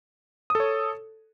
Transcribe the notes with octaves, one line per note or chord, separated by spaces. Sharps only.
A4 C#5 D#6